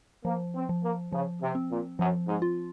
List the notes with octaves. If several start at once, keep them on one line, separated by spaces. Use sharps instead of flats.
F3 A#3
C4
F3
A#3
C#3 F3
C3
C4
A#2
F#2 F3
G#2
F4